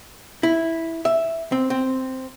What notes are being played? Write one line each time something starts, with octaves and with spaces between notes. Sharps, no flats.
E4
E5
C4
C4